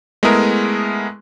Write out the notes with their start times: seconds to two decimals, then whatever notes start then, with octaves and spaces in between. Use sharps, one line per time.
0.23 G#3 A3 B3 E4 G#4 A#4